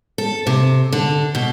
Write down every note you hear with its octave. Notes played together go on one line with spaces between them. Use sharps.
A4
C3
D3
B2